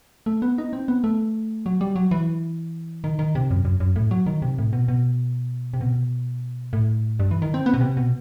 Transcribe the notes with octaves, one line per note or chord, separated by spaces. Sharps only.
A3
B3
D#4
C4
B3
A3
F#3
G3
F#3
E3
D#3
D#3
C3
F#2
F#2
F#2
A2
F#3
D#3
C3
A2
B2
B2
C3
B2
A2
G2
E3
D#3
C4
B3
B2
C3
B2